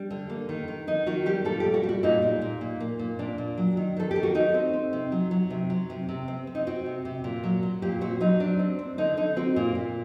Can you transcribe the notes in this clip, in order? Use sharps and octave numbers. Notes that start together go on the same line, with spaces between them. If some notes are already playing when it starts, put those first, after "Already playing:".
Already playing: G3 D4
D3
A#3
D#3
D#3
D#3 D#4
D#3 F#4
G3 G4
A#2 A4
G3 G4
F#4
G3
F#4
A#2 D#4
A#2
A#2
A#2
A#3
A#2
A#2 D4
A#2
F#3
D#3
D#3 A4
G4
D#3
F#4
A3 D#4
C4
C4
C3
F#3
F#3
C3
F#3
C3
C3
C4
C4
D#4
C4 F#4
C3
C3
A#2
F#3
F#3
A#2 G4
C4 F#4
F#3 D#4
C4 D4
C4
C4
D3 D#4
D3 D#4
C4 F#4
A#2
A#2